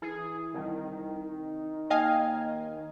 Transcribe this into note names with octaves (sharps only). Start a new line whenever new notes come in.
E3 G#4
C2 D#3
D#2 D#5 F5 G5 G#5